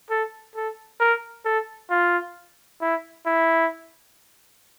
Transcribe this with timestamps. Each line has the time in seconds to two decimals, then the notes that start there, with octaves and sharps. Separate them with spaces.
0.10 A4
0.55 A4
1.00 A#4
1.45 A4
1.91 F4
2.81 E4
3.26 E4